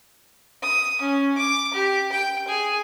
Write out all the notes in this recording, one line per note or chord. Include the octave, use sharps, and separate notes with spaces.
D#6
C#4
D6
G4
G5
G#4